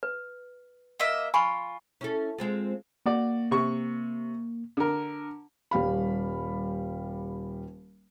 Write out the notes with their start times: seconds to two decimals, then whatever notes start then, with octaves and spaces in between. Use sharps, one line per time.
0.03 B4
1.00 A#3 D#5 E5
1.34 F4 G#5 B5 C#6
2.01 C#4 E4 A4
2.38 G#3 C4 F4
3.06 A#3 F#4 D5
3.51 C3 C#6
4.77 D3 A#4
5.71 D#1 G3 F5 B5